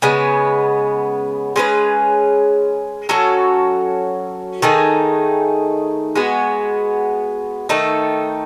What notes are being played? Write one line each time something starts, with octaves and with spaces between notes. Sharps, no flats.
C#3 G#3 B3
G#3 C#4 G#4 B4
F#3 C#4 F#4 A4
D#3 A3 D#4 G#4
G#3 B3 F#4
D#3 A3 D#4 A4